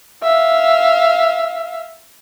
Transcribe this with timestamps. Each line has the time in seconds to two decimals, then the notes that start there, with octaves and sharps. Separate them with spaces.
0.23 E5 F5